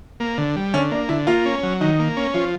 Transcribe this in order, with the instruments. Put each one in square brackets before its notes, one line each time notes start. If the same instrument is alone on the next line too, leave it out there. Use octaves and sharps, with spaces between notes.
[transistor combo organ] A#3
D3
G3
[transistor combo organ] D3 [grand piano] C#4
[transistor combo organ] A#3 [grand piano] D4
[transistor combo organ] D3 [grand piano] E4
[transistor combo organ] A#3 [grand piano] F4
[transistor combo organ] C#4
F#3
[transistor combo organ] D#3 [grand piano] D#4
[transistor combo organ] A#3
C#4
[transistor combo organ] F3 [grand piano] F4